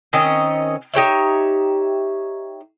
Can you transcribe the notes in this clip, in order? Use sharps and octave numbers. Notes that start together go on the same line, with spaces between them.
D#3 C4 C#4 D#5
D#4 G4 C#5 E5